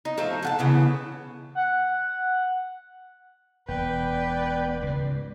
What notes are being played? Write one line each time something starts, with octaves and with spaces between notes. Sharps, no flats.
D#4
F3 A3 A4
A4 F#5 A5
C#3 E3 B3
F#5
E1 B3 B4 D5 G5
C#2 G#2